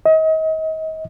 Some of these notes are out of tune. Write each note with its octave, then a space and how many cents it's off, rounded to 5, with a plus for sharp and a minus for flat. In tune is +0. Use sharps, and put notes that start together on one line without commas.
D#5 +35